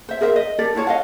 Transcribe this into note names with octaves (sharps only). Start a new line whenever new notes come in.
C5 E5
G#4 A#4 C5 E5
D#5
G4 A4 A#4 D5
E4 F4 C#5 A5
D#5 F5 F#5